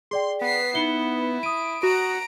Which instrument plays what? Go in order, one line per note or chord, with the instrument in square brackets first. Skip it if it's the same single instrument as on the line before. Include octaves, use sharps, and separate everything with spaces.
[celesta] G#4 D5 G5 [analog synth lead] C6
[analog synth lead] B3 [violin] B6 C7
[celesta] D#4 C#7 G7 [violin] E4
[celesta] D#6 D#7 [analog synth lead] D7
[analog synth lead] F#4 [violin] A#5 D7